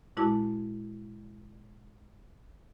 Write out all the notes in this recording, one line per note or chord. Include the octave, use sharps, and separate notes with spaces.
A#2 G#3 E4 F#4 A5 D6